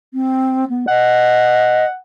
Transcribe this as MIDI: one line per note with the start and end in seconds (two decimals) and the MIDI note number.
0.14 0.65 60
0.69 0.86 59
0.88 1.85 75
0.88 1.97 78